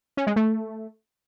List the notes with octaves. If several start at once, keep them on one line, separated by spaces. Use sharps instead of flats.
C#4
G#3
A3